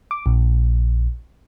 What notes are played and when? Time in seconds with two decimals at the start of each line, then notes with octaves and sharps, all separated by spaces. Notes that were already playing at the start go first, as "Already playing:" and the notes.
0.11 D6
0.26 A#1